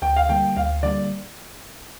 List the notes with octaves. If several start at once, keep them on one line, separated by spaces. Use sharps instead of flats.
D2 G5
F5
D3 G3 A#3 G5
D2 F5
D3 G3 A#3 D5